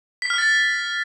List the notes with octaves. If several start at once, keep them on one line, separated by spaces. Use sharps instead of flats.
B6
F6
A6